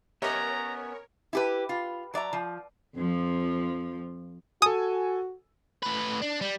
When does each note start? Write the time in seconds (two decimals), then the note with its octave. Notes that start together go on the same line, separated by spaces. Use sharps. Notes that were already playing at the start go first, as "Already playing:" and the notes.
0.22 B3 C#4 G4 A#4 C#5 D#5 E5 A#5
1.33 E4 G4 B4
1.69 F4
2.14 F#3 D5 E5 A#5
2.33 F3
2.96 F2 F3
4.62 F#4 A4 G#5 D#6
5.83 A2 B4
6.22 D4
6.41 G3